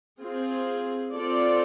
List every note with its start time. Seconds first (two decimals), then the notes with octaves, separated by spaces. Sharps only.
0.21 C4 F4 G#4
1.13 C4 F4 A4 D5